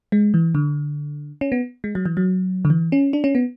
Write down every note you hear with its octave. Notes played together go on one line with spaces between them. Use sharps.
G#3
E3
D3
C#4
B3
G#3
F#3
E3
F#3
D3
E3
C#4
D4
C#4
B3